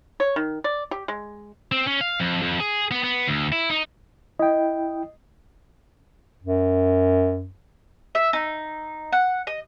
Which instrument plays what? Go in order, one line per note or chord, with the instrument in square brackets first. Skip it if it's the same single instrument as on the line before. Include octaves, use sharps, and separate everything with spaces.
[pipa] C#5
D#3
D5
G4
G#3
[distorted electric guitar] C4
C#4
F5
F2
F2
G#4
B3
B3
D2
E4
D#4
[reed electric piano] E4 G5 [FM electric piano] D#5
[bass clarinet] F#2
[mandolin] E5
D#4
F#5
D#5